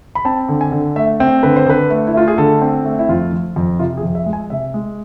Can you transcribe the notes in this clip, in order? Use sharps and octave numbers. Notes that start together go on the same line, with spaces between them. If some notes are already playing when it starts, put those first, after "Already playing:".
B5
C4 A5
D3
G#5
D3
A3 E5
C4
D3 B4
C5
D3 B4
A3
E4
A3 F4
G#4
D3 A4
C4
A3
E4
F2 F4
F3
F2
C3 F4
G#4
F2
E5
G#3
G#5
C3 E5
G#3